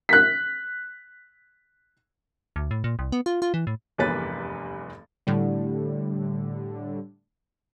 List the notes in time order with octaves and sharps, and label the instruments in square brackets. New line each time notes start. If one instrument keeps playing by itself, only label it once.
[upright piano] F#6 B6
[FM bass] D2
A2
A#2
C2
B3
F4
F4
E3
A2
[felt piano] F1 E2 G2 A#3 B4 A6
[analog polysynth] A2 D3 G3